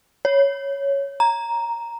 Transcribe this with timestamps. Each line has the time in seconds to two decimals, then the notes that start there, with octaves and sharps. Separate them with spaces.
0.25 C#5
1.20 A#5